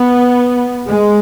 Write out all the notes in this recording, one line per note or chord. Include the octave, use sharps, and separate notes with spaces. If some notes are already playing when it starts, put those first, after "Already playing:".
Already playing: B3
G#3